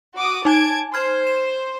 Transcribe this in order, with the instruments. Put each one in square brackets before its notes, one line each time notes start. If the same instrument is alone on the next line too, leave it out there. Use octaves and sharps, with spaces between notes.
[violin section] F#4 D6 D#6
[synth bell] D#4 G#5 [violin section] A5 G#6 D7
[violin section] C5 [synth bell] F6 G#6
[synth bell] E7